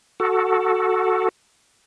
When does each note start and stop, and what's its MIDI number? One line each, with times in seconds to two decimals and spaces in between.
0.20 1.29 66
0.20 1.29 69